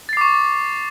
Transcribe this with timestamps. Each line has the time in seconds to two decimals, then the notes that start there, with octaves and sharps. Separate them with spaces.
0.09 A6
0.13 C7
0.17 D6
0.21 C#6